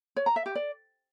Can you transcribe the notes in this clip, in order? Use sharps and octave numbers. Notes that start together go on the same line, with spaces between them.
C#5
A#5
E5
G4
D5